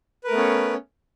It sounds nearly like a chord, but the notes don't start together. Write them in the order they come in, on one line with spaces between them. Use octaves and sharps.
B4 A#4 A3 B3 C#4